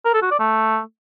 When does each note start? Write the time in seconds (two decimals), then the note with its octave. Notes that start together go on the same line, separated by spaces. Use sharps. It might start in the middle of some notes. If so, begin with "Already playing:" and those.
0.05 A#4
0.14 A4
0.22 F#4
0.31 D5
0.40 A3